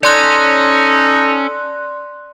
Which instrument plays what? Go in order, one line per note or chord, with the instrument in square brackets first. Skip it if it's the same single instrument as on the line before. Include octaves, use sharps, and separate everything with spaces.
[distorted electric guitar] C#4 [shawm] D#4 [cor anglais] A4 [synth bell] D5 C6 F#6